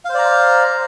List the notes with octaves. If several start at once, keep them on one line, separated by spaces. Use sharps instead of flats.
C5 D5 F5 A#5